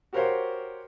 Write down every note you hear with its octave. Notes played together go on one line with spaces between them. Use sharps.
F#4 G4 A#4 C5 C#5 F5